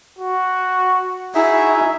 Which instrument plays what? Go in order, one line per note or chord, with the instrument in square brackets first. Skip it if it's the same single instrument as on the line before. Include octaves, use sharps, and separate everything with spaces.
[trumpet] F#4
[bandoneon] D#4 G#4 E5 [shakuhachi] E4 [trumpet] F#4